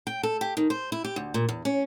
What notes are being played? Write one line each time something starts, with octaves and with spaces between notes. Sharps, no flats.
G5
A4
G4
D#3
C5
E4
G4
D2
A#2
E2
C#4